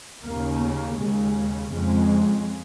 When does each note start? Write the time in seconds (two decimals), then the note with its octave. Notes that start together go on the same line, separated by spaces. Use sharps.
0.24 D#2 C#3 A#3
0.62 A#3
0.98 D#2 C#3 G#3
1.71 F2 C#3 G#3